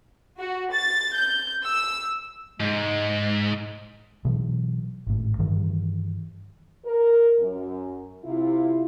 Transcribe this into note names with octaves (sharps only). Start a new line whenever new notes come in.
F#4
A6
G6
E6
G#2 G#3
B2 E3 F#3 B3
G#1 A2
G2 D#3 E3 G3
A#4
F#2
C3 E4 F4